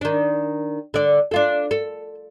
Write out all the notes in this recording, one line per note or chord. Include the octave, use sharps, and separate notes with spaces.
D#3 D4
D3 D5
D4 F4 A4
A4